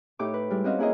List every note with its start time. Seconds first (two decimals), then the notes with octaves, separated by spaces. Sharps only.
0.19 A2 D#4 G4 D6
0.34 B4
0.50 G3 G#3 E4
0.64 C4 C#4 F#4 D#5 F5
0.79 A#3 E4 G#4 A#4 D#5